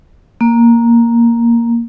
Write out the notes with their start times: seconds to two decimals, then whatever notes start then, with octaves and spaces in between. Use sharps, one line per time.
0.41 A#3